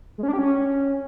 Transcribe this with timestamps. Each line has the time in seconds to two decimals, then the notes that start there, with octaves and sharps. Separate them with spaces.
0.18 G#3
0.23 C#4
0.28 D4
0.33 G4
0.39 C#4